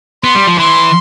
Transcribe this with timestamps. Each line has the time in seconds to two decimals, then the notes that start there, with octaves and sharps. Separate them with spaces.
0.24 B3 C6
0.35 G3
0.47 F3
0.58 E3 C6